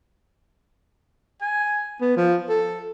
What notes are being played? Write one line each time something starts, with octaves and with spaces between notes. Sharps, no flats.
G#5
B3
F3
A4